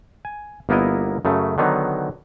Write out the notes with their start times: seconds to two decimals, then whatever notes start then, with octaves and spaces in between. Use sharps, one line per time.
0.25 G#5
0.69 G1 A#3 B3 E4 A#4 D#5
1.25 F#2 C#3 A3
1.58 D3 D#3 F#3 B3 D#4